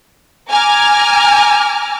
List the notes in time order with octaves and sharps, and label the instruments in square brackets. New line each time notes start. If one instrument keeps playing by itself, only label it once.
[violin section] G#5 A#5 D6 F6